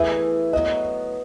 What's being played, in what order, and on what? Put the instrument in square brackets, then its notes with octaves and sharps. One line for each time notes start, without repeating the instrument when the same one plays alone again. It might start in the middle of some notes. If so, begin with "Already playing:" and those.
Already playing: [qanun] E3 A3 B3 E4 G#4 [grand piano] E5
[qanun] F#3 B3 F#4 [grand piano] D#5